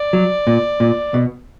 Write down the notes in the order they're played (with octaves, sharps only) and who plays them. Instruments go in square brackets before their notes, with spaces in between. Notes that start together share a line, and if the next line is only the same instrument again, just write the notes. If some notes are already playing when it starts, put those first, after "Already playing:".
Already playing: [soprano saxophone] D5
[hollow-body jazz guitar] F#3
A#2
A#2
B2